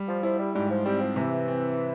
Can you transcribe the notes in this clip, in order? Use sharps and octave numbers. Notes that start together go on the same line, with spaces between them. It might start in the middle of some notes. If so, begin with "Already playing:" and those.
Already playing: G3
F3
F3 E4
G3
G#2 G3
F3
G3 C4
F3
C3 E3
C4